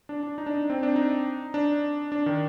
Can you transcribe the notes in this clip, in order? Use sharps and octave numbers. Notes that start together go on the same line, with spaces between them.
D4
D4
D#4
D4
D#4
C4
D4
D#4
D4
D4
D#3